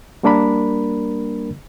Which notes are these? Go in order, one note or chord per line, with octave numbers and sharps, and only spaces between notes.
G3 A#3 D4 A#4 B5